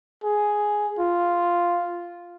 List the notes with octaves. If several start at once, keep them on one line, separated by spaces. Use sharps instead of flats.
G#4
F4